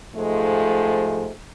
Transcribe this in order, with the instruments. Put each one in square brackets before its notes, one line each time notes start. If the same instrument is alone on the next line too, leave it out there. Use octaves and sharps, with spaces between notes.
[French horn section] G#2 C3 F3 G#3 A3